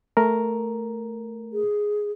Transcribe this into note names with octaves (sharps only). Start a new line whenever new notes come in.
A3 A#4
G#4